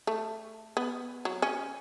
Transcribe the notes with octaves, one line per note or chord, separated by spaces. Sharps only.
A3
B3
F#3
C#4